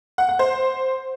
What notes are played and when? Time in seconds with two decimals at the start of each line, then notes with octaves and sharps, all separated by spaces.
0.18 F#5
0.29 F#5
0.39 C5